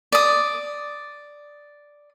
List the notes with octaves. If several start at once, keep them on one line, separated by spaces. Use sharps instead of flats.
D5 D#6